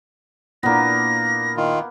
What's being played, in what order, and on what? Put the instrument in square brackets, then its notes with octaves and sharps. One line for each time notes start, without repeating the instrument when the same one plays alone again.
[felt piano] A#2 D4 E4 [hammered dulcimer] A#3 B3 [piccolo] A#6
[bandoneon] D#3 F4